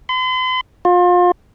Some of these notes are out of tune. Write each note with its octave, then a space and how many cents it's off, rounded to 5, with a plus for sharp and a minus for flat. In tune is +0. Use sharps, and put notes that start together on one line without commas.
C6 -45
F4 +30